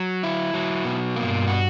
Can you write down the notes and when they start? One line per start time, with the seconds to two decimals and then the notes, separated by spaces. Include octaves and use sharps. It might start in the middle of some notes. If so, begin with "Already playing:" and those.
Already playing: F#3
0.23 E4
0.54 F#3
0.85 B2
1.16 G2 A#3
1.47 F#4